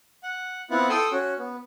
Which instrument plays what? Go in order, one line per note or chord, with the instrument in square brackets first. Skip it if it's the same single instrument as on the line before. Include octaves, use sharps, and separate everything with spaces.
[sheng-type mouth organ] F#5
B3 C4 E4 F4 F#5
A4 G5 C6 D#6 E6
C#4 F#4
B3